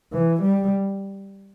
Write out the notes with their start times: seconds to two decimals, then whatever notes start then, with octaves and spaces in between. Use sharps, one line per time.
0.12 E3
0.42 G3